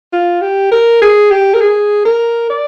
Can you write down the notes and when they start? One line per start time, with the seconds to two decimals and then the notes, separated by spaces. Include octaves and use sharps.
0.13 F4
0.42 G4
0.72 A#4
1.02 G#4
1.31 G4
1.54 A#4
1.61 G#4
2.05 A#4
2.50 D5